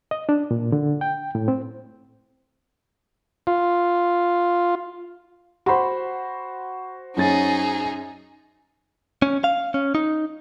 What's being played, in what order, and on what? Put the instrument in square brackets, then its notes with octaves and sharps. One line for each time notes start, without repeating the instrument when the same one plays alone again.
[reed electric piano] D#5
D4
A#2
D3
G5
A2
C4
[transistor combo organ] F4
[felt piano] F#4 C5 [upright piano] B5 C6
[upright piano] F#2 C#4 A6 [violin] D#4 G#4
[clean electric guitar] C#4
F5
C#4
D#4